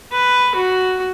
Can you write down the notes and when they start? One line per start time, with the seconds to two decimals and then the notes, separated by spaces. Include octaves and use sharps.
0.12 B4
0.55 F#4